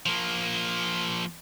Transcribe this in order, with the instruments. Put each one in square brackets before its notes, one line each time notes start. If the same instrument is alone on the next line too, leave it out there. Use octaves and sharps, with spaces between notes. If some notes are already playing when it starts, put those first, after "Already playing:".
[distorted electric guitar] F3 A#3